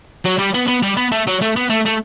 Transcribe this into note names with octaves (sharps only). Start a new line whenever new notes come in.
F#3
G3
B3
B3
G3
B3
A3
F#3
A3
B3
A3
A3